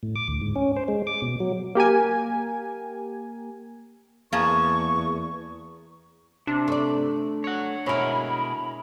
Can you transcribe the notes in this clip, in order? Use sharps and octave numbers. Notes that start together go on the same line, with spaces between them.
A2
D6
D2
G#2
C#4
C5
G#3
D6
B2
F#3
A#3 G4 A#4 G#5
E2 A#3 G#4 A5 C#6
C3 D4
A3 D5
C#5 F#5
B2 G#3 E4 A#4 C#5 B5